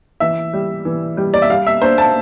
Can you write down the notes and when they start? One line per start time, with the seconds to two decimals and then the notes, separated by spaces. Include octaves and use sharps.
0.20 E3 E5
0.53 G3
0.85 E3
1.17 G3
1.34 D5
1.42 E5
1.50 G3 F5
1.67 E5
1.82 D4 C5
1.98 A5